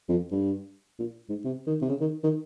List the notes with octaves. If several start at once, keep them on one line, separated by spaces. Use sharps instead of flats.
F2
G2
A#2
G#2
C3
D#3
C3
C#3
D#3
D#3